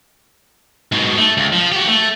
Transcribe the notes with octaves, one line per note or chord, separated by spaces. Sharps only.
G#2 B2
A3
C#2
F3
F#4 G4
A3